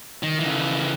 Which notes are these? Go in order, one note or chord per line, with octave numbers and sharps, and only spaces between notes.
D#3
C#3 E3